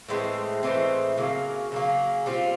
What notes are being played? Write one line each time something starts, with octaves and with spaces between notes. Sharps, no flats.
A2 E3 G#3 C4
A2 E3 G#3 C4
C#3 F#3 A#3
C#3 F#3 A#3
G3 C4 F4